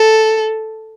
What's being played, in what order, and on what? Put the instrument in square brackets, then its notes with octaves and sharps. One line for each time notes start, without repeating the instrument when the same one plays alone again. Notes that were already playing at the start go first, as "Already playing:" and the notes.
Already playing: [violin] A4